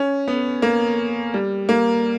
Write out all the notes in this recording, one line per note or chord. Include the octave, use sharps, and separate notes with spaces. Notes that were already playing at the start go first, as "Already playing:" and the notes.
Already playing: C#4
B3
A#3
G3
A#3